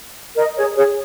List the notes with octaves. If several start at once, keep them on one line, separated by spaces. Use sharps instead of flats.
A#4 D#5
G#4 C#5
G#4 C#5